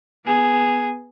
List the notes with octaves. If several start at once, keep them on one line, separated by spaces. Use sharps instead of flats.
B3 G#4